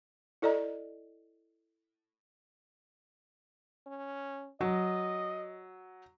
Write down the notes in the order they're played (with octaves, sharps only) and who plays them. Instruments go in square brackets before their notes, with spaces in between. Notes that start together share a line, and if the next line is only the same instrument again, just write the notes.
[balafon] E4 A4 D5 D#5 A#5
[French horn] C#4
[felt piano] F#3 [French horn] D#5